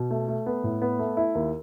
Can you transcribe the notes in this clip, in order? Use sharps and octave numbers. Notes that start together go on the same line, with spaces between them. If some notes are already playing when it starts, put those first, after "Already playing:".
Already playing: B2
A3
A3
B3
A2
B3
A3
E4
D#2